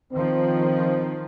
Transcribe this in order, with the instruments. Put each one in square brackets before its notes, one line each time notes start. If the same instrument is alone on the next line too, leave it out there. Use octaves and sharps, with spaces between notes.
[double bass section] D#3 F3 [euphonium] C4